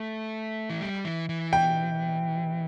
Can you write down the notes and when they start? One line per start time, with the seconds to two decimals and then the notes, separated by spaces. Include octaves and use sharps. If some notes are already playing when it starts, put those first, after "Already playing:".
Already playing: A3
0.70 E3
0.81 G3
1.05 E3
1.29 E3
1.53 G5